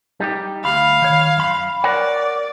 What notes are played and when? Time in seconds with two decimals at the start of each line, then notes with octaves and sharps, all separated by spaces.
0.20 G3 D#4 G4
0.64 D2 F5 B5
1.02 D#3 C#5
1.37 F#2 B5
1.84 A#4 C#5 D5 F#5